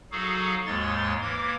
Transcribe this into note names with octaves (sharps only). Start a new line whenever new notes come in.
F#3 D#4 F#4 G#4 A4 F5
D#2 G#2 G#3 C#5 C6 A6
E3 A#3 D6 G#6